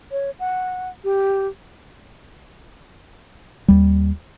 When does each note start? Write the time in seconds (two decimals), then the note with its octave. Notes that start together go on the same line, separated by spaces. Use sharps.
0.12 C#5
0.40 F#5
1.04 G4
3.68 D#2 G3